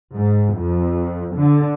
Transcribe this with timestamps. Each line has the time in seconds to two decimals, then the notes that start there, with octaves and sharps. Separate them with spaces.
0.15 G#2
0.57 F2
1.34 D3